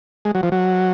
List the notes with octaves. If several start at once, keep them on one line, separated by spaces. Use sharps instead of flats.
G#3
F#3
F3
F#3